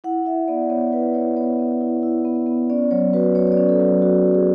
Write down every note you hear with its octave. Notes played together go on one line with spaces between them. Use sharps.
E4 F#5
E4 E5
B3 D5
B3 C#5
E4 B4
E4 C#5
B3 C#5
B3
E4
E4
B3
B3
C#4 D5
F#3 C#5
F#4 B4
F#3 C#5
C#5
D5
C#4
A4
F#3
F#4
F#3
G#4